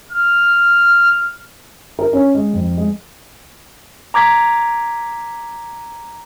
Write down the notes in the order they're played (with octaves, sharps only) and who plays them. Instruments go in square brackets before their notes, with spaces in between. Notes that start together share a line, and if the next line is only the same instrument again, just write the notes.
[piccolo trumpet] F6
[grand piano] A#4
C#4
G#3
F2
G#3
[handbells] A#5 D6 G#6 B6